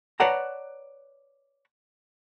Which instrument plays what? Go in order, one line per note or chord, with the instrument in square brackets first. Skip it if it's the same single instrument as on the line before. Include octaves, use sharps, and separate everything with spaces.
[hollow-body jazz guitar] B4 C#5 D5 F#5 A5 A#5